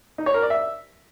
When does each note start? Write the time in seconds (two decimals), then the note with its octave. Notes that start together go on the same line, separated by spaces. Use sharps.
0.18 D#4
0.26 C#5
0.34 A#4
0.42 D5
0.50 E5